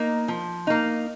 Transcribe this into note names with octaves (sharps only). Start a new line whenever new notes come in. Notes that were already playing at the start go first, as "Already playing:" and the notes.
Already playing: A#3 D#4
F3
A#3 D#4